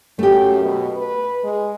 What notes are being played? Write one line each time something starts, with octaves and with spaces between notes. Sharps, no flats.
F#2 A3 G4
B2
B4
G#3